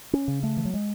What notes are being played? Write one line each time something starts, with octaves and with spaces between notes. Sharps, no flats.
C#4
C#3
A3
E3
F#3
G#3